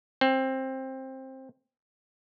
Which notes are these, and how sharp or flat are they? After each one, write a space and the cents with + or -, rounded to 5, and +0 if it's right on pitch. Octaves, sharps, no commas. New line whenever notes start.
C4 +15